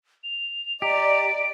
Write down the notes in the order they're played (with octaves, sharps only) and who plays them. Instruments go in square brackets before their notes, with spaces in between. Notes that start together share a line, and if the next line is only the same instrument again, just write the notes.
[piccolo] F7
[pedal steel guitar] G4 [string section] D5 [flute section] D#5 A#5 [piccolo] D7